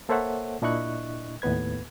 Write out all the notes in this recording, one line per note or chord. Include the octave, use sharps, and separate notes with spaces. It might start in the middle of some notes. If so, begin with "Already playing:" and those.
A#3 A4 C5 C#5 E5 F#5
A#2 D4 E4 D#5 C#6 F#6
D#2 A2 B3 B4 G#6